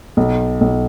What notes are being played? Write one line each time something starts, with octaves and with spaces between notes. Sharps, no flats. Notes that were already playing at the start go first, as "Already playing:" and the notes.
B1
B1